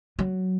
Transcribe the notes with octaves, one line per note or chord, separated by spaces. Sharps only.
F#3